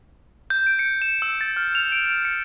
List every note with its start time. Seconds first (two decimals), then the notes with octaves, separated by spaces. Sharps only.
0.50 G6
0.67 D7
0.79 C#7
1.02 E7
1.22 E6
1.41 A6
1.56 F6
1.75 F7
1.92 D7
2.06 F7
2.25 C#7